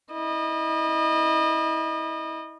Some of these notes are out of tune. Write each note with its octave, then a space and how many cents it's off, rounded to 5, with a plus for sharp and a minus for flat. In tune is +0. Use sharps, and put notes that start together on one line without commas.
E4 -30 D#5 -30